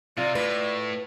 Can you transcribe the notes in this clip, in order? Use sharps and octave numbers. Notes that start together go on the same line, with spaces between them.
C3 F4 D5
A2 B4